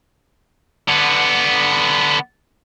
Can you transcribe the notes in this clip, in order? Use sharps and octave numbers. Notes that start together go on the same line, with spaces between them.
D3 B3